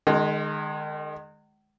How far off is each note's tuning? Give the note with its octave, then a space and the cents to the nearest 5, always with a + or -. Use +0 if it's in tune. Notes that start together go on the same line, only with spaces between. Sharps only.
D#3 -35 G#3 +5